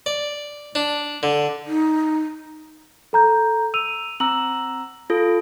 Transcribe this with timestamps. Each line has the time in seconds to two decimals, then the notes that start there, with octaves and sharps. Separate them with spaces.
0.06 D5
0.75 D4
1.23 D3
1.67 D#4
3.13 A4 A#5 G6
3.74 E6 D#7 F7
4.20 C4 A#5 E6 F#7
5.10 F4 A4